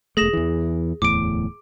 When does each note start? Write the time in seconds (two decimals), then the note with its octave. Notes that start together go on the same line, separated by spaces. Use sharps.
0.17 E1 A3 G#4 A#6 E7
0.33 E2 E3
1.02 D1 E2 A2 D6 D7